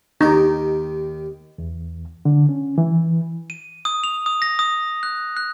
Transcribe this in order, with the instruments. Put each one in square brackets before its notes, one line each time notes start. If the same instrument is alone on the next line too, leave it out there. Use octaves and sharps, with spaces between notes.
[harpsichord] D#2 D#3 G4 [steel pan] D#4
[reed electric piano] E2
D3
C#4
E3
[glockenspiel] D#7
D#6
F7
D#6
A#6
D#6
F#6
F#6